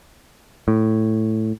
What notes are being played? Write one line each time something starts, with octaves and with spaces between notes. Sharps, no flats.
A2